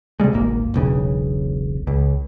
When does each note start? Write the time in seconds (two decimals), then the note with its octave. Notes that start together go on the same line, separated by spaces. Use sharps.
0.20 C3 E3 G3 G#3
0.33 D1 G#1 A#3
0.74 E1 B1 C#3
1.87 C#2